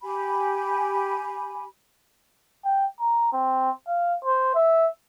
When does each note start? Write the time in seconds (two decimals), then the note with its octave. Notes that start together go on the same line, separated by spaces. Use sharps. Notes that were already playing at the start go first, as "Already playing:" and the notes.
0.03 G4 G#5 B5
2.65 G5
3.00 A#5
3.33 C4
3.87 F5
4.24 C5
4.55 E5